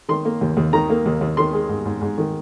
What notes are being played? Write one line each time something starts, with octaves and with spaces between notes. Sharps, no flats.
D#3 C6
A#3
D#2
D#2
D#3 A#5
A#3
D#2
D#2
D#3 C6
G#3
G#2
G#2
G#2
D#3